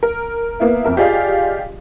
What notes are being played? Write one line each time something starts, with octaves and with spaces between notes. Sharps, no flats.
A#4
A#3 B3 E4
F2 A#4 E5
F4 G4 G#4 D5 D#5 F5